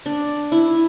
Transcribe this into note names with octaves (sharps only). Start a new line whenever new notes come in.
D4
E4